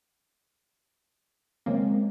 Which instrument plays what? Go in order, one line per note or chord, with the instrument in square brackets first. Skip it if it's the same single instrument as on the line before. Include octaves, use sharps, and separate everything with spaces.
[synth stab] C#3 F3 A#3 [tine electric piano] G#3 C4